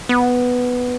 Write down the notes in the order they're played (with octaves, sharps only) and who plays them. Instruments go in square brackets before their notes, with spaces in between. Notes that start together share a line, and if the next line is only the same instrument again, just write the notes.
[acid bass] B3